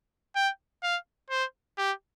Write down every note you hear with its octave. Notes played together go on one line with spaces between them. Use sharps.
G5
F5
C5
G4